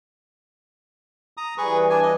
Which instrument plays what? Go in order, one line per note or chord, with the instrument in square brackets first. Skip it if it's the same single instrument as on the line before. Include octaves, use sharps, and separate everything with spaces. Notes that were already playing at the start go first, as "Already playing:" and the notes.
[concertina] A#5 D#6
[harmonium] E3 G3 [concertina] G#4 B4 C#6
[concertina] D4 G#5
D#5